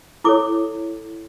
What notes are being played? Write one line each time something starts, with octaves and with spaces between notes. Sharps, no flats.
E4 A4 C#5 D6